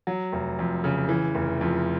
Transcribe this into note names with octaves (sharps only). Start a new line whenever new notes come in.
F#3
F1
F2
C#3
E3
F1
F2